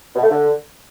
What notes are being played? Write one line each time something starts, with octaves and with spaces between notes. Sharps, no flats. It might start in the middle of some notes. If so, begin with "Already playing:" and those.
B2
A3
D3